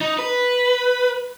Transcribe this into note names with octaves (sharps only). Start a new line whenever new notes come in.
D#4
B4